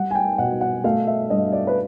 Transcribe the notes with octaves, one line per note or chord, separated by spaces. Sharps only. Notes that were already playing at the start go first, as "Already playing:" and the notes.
Already playing: G3 F#5
G#5
G5
B2 F#5
F#5
A3 F5
E5
G2 D#5
D5
B4